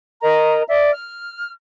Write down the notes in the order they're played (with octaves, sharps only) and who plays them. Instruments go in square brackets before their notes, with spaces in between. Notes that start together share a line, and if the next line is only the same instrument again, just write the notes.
[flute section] A#4 D#5 A#5
D5 E5
F6